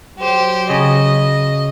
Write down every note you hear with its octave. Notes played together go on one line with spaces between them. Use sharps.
F#3 G4 C5
C#3 D#5